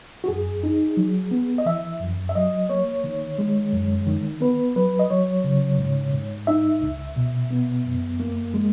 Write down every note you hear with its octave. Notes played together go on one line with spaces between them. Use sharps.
F#4
F#2 G#4
D#4
F#3
B3
D#5
E3 E5
F#2
E5
F#3 D#5
A#3 C#5
D#3
G#3
F#2
D#3
B3 B4
F#3 B4
D#5
F#3 C#5
C#3
G#2
G#2
D#4 E5
C#2
B2
B3
F#2
A#3
G#3